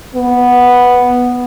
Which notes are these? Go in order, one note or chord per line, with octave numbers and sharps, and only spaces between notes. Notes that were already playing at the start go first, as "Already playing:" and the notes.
B3